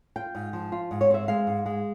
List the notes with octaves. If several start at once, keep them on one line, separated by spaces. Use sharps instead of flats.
F4 G5
G#2
F3
F4
G#2
C#5
C4 E5
G#3 F5
G#2
G#3